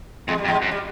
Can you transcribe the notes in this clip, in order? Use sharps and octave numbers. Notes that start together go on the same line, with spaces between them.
F2 G#3
G3
F2
G#2 G#3
F#2
G3